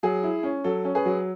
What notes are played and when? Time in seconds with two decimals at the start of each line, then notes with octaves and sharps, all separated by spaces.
0.03 F#3 G#4
0.23 E4
0.43 C#4
0.64 F#3 A4
0.85 C#4
0.95 G#4 B4
1.05 F#3